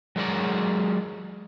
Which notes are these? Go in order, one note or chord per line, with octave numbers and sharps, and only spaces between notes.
F#3 G#3 A#4 C#5 D5